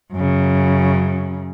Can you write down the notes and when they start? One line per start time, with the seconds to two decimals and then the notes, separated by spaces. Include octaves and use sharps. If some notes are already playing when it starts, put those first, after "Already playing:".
0.12 F#2 C#3